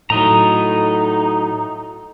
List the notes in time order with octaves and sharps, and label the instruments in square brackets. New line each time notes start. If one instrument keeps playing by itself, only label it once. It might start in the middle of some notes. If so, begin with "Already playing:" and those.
[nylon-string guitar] A2 F#3 [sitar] A3 [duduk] D#4 [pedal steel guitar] D#5 A#5